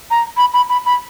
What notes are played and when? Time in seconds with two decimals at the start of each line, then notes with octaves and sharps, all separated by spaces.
0.11 A#5
0.37 B5
0.53 B5
0.69 B5
0.86 B5